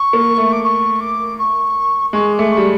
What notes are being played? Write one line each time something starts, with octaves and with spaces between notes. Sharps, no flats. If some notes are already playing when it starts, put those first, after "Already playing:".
Already playing: C#6
A#3
A3
D6
C#6
D6
C#6
G#3 C#6
D6
A3
C#6
G3